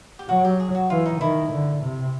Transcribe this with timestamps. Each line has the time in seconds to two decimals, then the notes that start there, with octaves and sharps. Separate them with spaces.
0.19 G4
0.29 F#3 F#4
0.45 G4
0.60 G#4
0.75 F#4
0.90 E3 F4
1.06 D#4
1.21 D#3 E4
1.51 D3
1.83 C3